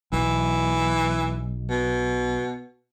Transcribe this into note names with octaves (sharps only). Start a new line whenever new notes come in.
B1 E3
B2